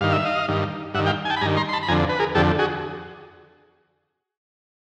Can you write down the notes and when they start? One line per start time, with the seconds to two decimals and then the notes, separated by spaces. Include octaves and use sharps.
0.01 G2 D#3 F5
0.13 E5
0.25 D#5 F5
0.48 G2 D#3
0.94 G2 E5 F#5
0.99 D#3
1.06 F5 G5
1.25 G#5
1.30 G5 A5
1.36 B5
1.41 G2 G#5 A#5
1.46 D#3
1.57 A#5 C6
1.69 C6
1.73 A5 B5
1.83 B5
1.88 F2 G#5 A#5
1.91 D3
2.09 B4
2.20 G#4 A#4
2.35 F2 D3 G4 A4
2.59 F#4 G#4